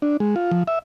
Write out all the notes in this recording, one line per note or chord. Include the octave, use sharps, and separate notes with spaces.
D4
G#3
F4
F3
E5